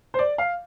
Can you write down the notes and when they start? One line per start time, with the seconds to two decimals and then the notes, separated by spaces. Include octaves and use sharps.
0.14 C5
0.19 D5
0.38 F5